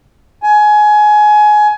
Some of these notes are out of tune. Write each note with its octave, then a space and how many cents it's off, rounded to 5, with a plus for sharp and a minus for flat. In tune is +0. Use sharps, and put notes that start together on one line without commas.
G#5 +20